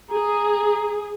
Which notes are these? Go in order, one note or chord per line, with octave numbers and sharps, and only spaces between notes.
G#4 A#5